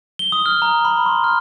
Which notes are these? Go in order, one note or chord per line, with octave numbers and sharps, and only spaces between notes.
G7
D#6
F6
A#5
B5
C6
F6